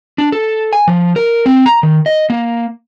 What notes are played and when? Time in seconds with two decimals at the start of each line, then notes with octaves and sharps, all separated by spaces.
0.18 D4
0.32 A4
0.73 G#5
0.88 F3
1.16 A#4
1.46 C4
1.66 A#5
1.83 D#3
2.06 D#5
2.30 A#3